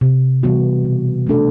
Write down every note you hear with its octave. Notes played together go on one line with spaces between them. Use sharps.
C3
E3 G3 B3 F#4
B2
A3 D4 A4